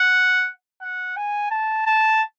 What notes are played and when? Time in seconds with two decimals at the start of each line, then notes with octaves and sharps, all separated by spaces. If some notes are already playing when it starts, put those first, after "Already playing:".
Already playing: F#5
0.82 F#5
1.16 G#5
1.51 A5
1.86 A5